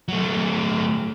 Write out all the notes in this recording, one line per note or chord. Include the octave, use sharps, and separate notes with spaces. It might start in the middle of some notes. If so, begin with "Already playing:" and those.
F#3 A3